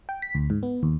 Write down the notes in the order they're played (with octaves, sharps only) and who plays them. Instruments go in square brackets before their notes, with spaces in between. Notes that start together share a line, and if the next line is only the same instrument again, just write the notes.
[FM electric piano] G5
B6
D2
G#2
B3
D#2